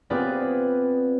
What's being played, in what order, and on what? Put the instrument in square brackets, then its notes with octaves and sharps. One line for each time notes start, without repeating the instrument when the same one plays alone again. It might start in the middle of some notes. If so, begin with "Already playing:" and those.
[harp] B3 C4 F4 G#4 B4 D5